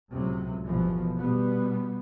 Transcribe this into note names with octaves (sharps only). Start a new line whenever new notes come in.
C#2 A2 C3 F#3
G1 B2 E3 F3
B2 G3 B3